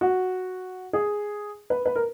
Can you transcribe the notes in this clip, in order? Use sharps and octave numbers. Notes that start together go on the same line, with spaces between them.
F#4
G#4
B4
B4
A#4